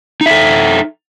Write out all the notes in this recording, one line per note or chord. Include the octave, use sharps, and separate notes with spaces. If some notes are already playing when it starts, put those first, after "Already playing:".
D#4 A4 E5